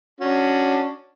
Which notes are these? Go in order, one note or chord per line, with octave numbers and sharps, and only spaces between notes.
C#4 D4 F#4